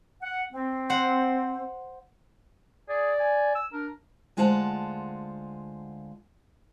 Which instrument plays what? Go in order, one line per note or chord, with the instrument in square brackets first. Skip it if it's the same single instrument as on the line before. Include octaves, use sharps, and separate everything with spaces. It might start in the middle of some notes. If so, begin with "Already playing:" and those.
[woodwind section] F#5
C4
[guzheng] C5 F#5
[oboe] G#4 [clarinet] D5
[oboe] G#5
[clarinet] E6
[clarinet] D4 [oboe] A#4
[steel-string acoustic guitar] D2 G#3 F4 C5 F#5 A5